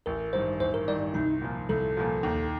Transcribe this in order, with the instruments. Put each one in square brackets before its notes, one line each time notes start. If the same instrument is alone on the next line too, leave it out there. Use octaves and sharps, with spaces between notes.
[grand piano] A1 [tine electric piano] A#4
[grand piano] G2 D#3 [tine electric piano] C5
[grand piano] A1 [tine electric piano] C5
[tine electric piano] A#4
[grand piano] G2 D#3 [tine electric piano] D5
[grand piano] C2 [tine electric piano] D#4
[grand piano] A#2 F3
[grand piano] C2 [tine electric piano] A4
[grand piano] A#2 F3
D#2